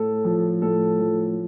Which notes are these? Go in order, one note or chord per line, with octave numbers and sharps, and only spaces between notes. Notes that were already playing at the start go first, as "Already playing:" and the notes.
Already playing: A2 A4
F3
A2 A4
F3